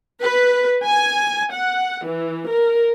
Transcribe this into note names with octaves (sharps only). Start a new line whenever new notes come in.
B4
G#5
F#5
E3
A#4